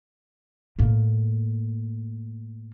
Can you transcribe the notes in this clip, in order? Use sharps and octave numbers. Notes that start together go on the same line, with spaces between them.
A2 A#3